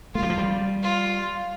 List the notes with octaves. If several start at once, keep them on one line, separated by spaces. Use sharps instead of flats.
A3 F4
G3
F3
G3
F4